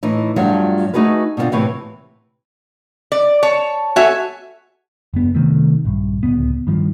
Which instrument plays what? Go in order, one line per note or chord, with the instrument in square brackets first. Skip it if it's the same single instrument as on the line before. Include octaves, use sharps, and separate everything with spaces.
[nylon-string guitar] A2 E3 D#4
G2 F3 F#3 A3
A3 D#4 F#4 G#4 B4
B2 D3 B3 C4 F4
A2 C3 E3 B4 C#5
[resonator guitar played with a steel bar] D5
[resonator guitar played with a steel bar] C#5 [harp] A5
[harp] F#4 A4 G#5 [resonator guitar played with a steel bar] C#5 E5
[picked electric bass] F#1 B3
C3 D#3 A3
A#1 G2
D1 G1 C#2 B3
G2 D#3 F3